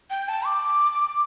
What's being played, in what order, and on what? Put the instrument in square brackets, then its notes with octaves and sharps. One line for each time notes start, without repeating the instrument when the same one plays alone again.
[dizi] G5
A5
D6